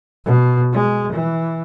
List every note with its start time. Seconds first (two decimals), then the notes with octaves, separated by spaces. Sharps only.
0.25 B2
0.72 G#3
1.12 E3